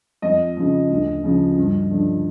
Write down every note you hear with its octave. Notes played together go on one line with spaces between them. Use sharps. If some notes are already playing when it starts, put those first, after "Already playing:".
F2 D#5
C#3 F3
D2
C#3 F3
G2
D3 F3